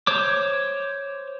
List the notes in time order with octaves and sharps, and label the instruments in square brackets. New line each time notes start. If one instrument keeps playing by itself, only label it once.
[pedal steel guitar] C5 C#5 D6